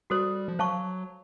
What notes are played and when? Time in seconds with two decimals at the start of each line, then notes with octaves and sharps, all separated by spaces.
0.10 G3 F#4 A4 C5
0.48 F3
0.59 F#3 C5 F5 A5 C#6